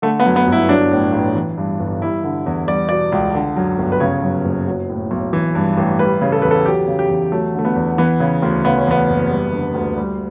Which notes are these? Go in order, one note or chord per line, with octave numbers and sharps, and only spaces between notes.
D3 A3
B3
F#2
B3
G1 E4
F#3 D4
A2
A1
E3
G2
G1
G3 E4
D3
E2
G3 D5
B2 D5
C#2
D3
F#2
G1
B4
C#3 C#5
F#2
F#1
F#3
A2
B1
E3
G2
A1
G3 B4
C#3
A4
E2 B4
A4
F#3 G4
C#3
G4
E2
F#3 A3
D3 A3
B3
E2
E3 B3
C#3
D2
C#3 B3
C#4
E2 B3
F#1
G3
D3
D2
G3